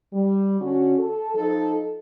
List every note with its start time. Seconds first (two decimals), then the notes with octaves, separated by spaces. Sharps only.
0.13 G3
0.60 D3 C#4 F#4
0.98 A4
1.35 F3 D#4 A4